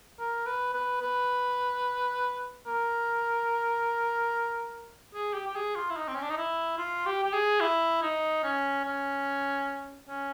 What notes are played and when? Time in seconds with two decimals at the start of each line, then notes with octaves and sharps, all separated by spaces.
0.20 A#4
0.47 B4
0.74 B4
1.01 B4
2.67 A#4
5.14 G#4
5.34 G4
5.47 G4
5.55 G#4
5.75 F4
5.90 E4
5.97 D#4
6.08 C4
6.15 C#4
6.22 D4
6.30 D#4
6.37 E4
6.78 F4
7.06 G4
7.24 G4
7.33 G#4
7.60 E4
8.02 D#4
8.43 C#4
8.85 C#4
10.08 C#4